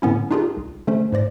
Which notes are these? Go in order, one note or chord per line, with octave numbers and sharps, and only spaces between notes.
A2 D3 B3 C#4 E4
D4 D#4 F4 G4 G#4 A#4
C2
D3 A3 C#4 C5
G#2 C5 D5 A#6